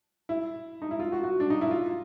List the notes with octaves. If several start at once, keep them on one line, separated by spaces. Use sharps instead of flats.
E4
D#4
E4
F4
F#4
F#4
D4
D#4
E4
F4